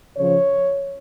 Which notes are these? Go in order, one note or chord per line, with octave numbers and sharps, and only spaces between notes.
C#3 F3 C#5